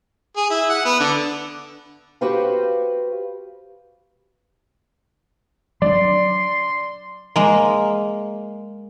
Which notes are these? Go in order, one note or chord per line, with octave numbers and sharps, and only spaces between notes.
G#4
E4
F#5
B3
D3
F#4 G4 B4 C5 F5
F#3 C#4 D4 D5 C6
G#3 A#3